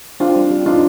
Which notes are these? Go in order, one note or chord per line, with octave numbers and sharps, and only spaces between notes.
C4 D4 F4
G3
G3
D4 D#4 F4